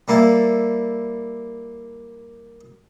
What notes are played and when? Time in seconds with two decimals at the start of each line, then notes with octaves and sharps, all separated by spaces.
0.08 G3 A#3 E4 A4